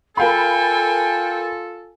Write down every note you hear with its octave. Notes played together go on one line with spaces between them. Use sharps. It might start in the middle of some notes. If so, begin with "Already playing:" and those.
F4 A4 A#4 F5 G5 G#5 B5